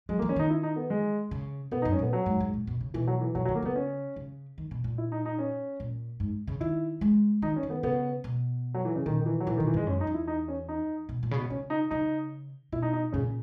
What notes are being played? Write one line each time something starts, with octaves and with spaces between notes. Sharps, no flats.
F#3 G#3
A#3
E3
C#4
D#3 D#4
E4
D#4
B3
G#3
C#3
B2 B3
D#4
F#2
C#4
A#2 B3
F#3
G#2
G#2
A#2
B2
C#3
B2 E3
F#3
E3
B2 F#3
F#3
D#3
A#3
C#3 B3
C#4
C#3
D#3
B2
A#2
E4
D#4
D#4
C#4
A#2
G#2
C#3
D#3 E4
G#3
D#3 D#4
C#4
D#3
B3
C#3 B3
B2
F#3
E3
C#3
A#2 D#3
D#3
E3
F#3
A#2 E3
D#3
A#2
E3
G#2 G#3
F#2 C#4
D#4
E2
E4
D#4
C#4
D#4
B2
A#2
C#3
B2
C#3 C#4
D#4
C#3 D#4
B2 E4
D#4
D#4
A#2 C#3